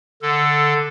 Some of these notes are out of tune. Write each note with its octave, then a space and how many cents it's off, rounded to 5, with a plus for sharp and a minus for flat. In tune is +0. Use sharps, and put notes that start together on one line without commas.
D3 +5 A4 +0